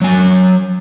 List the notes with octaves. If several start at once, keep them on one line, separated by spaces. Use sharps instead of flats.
F#3 G#5